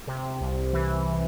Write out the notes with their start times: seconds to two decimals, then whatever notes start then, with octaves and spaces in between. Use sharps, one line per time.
0.07 C3
0.41 C2
0.73 E3